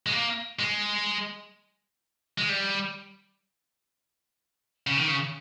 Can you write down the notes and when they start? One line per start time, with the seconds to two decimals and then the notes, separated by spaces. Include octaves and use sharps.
0.06 G#3
0.12 A#3
0.59 G#3
2.38 G#3
2.49 G3
4.87 C#3
4.97 D#3
5.07 C#3